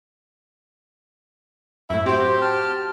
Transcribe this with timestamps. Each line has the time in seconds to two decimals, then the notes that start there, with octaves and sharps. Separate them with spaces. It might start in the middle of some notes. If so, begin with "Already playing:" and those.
1.90 F#2 A2 E4
2.06 C4 F#4 G4 C5
2.42 A5 F6